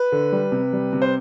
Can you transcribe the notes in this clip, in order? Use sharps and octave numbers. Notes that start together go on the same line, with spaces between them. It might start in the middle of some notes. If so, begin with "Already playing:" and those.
Already playing: B4
D3
G3
C3
G3
C3
C5